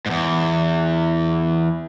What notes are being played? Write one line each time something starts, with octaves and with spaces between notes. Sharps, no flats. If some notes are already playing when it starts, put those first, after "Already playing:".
E2 G#2